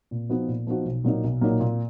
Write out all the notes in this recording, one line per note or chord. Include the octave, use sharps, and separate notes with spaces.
A#2
F3 B3 D#4 F#4
A#2
F3 B3 D#4 F#4
B1
A#2 F#3 A#3 D#4
B1
A#2 F#3 A#3 D#4
A#2